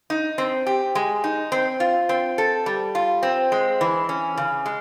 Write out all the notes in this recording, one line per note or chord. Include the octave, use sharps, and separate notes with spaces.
D#4
C4
G4
G#3
D#4
C4
F4
C4
A4
G3
F4
C4
G#3
E3
C#4
C#3
G#3